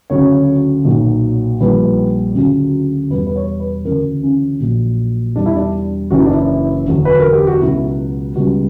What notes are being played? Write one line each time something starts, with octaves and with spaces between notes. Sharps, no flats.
D2 C#3 F#3 C#5
B1 A#2 F#3
A#1 A#2 G3 B4
D2 C#3 F#3
E2 B2 G3 B4
B4
C#5
B4
D2 C#3 E3 A#4
C#4
A#1 A#2 F#3
E2 B2 G3 D4
E4
D4
F#1 F#2 E3 F#4
E4
D4
E4
E1 D2 D3 F#3
B4
A#4
G4
F#4
C#2 B2 F#3 E4
C#2 B2 G3 F#4